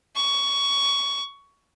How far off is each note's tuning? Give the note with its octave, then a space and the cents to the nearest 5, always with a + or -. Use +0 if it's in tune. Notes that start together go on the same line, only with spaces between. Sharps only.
C#6 +15